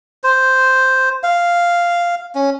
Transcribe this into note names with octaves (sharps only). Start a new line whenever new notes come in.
C5
F5
C#4